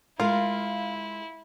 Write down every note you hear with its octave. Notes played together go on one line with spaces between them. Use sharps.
G#3 E4 F4 A#4 F5